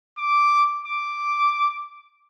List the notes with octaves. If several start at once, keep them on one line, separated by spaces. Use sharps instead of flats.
D6
D6